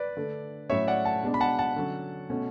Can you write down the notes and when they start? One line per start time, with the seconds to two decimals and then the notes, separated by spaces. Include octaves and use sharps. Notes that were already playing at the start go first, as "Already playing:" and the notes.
Already playing: B4 D5
0.17 D3 A3 D4
0.69 A2 F#3 C#4 C#5 E5
0.87 D5 F#5
1.05 F#5 A5
1.23 B2 G#3 B3 D4
1.34 B5
1.41 F#5 A5
1.59 F#5 A5
1.76 D3 F#3 C#4
2.30 B2 A3 C#4